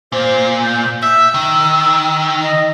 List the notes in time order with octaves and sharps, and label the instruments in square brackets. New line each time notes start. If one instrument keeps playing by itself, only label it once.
[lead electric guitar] A#2 [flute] C5
[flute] G6
[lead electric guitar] E5 [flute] E6
[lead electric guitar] D#3
[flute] D#5